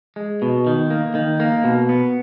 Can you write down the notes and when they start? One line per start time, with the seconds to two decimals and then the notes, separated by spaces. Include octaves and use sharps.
0.16 G#3
0.42 B2
0.67 D#3
0.90 A#3
1.15 D#3
1.40 A#3
1.64 B2
1.89 B3